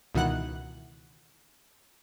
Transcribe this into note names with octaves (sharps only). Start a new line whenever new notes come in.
C#2 B2 D#3 E3 F#5 F#6